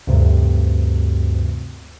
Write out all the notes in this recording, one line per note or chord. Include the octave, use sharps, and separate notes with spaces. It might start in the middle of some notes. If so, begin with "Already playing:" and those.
D2 G2 C3